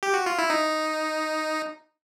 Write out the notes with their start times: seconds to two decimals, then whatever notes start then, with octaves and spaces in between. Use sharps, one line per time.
0.03 G4
0.14 F#4
0.26 F4
0.39 E4
0.50 D#4